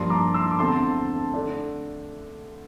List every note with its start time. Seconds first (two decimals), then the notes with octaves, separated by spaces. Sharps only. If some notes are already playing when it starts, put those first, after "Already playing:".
Already playing: G2 F3 A#3 D4 A5 C6
0.10 A#5 D6
0.34 C6 E6
0.51 D6
0.59 E2 D3 A3 C4 A5 C6
1.34 D3 A3 D4